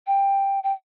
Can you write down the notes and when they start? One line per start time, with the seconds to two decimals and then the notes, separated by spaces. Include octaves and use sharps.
0.07 G5
0.64 G5